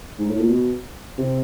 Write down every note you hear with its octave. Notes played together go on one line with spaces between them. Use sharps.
G#2
A2
A#2
B2
C3